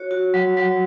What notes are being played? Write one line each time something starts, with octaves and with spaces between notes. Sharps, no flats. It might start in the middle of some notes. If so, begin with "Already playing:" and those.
Already playing: F#4 C#5
F#4
F#3
F#3